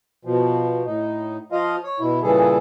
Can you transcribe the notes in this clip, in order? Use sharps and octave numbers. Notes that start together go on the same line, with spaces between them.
B2 F3
A2 D#4
F3 F4 D#5 F5
C#5
B2 E4
A#2 C#3 E3 G3 G#4 A4